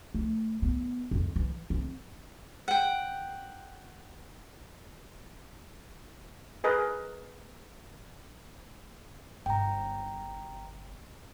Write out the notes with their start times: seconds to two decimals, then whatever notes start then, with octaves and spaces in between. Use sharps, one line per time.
0.14 A3
0.62 B3
1.11 F2
1.36 E3
1.70 C4
2.68 F#5 G5
6.64 G#4 A#4 B4 D#5
9.46 G1 G5 A#5